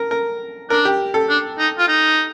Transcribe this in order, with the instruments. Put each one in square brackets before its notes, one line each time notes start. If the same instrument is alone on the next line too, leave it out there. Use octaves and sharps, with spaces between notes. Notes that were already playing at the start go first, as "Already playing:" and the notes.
Already playing: [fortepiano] A#4
A#4
[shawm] D4 [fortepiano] A#4
[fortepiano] G4
A4
[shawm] D4
D#4
F4
D#4